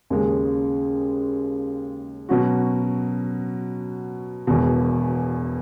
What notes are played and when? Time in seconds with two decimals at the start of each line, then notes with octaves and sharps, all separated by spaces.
0.10 D#2 C#3 G#3
2.29 B2 F#3 C#4 F#4
4.47 E1 E2 B2